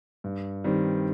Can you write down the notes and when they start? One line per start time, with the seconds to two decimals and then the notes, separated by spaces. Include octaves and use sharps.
0.24 G2
0.64 D#3 G3 C4